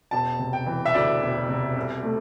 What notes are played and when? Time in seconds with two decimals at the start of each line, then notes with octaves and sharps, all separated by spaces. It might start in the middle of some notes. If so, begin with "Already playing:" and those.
0.11 E1 A5
0.39 C3
0.53 G5
0.66 E3
0.85 E5
0.94 D2 D5
1.21 E1
1.49 C3
1.76 C2
2.03 A3